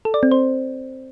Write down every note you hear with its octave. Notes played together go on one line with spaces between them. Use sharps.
A4
D5
C4
C5